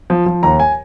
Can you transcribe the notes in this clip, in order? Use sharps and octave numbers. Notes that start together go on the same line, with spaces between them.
F3
F3
D#2 A#5
G#5